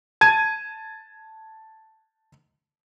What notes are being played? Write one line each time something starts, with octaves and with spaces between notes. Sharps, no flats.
A5 G#6 D#7